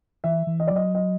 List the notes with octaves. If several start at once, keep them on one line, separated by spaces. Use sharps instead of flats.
E3 E5
E3
D#5
D5
F#3 D#5
D#5